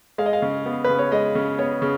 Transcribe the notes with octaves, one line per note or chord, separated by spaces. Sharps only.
G#3 F5
D#5
F5
C#3
B3
C#3 B4
C#5
G#3 D#5
C#3
B3 C#5
C#3